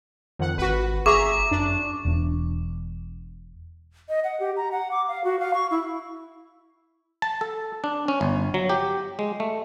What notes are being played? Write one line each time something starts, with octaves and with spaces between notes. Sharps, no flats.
F2 D#3 F#5
G#1 F#4 B4
G1 G#4 E5 A#5 C#6 D6
F#2 D4
E1 E2 C4 D4
D#5
F#5
G4
A#5
F#5
D6
F5
F#4
F5
C#6
E4
A5
A4
D4
C#4
G1
F#3
G4
G#3
A3